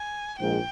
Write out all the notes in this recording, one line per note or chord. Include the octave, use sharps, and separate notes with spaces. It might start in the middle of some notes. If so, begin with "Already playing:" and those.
Already playing: G#5
A#1 G#2 G5